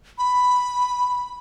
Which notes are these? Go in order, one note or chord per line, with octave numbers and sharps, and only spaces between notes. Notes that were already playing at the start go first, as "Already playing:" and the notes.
B5